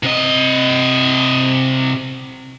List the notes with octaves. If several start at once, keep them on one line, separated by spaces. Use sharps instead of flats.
C3 D#5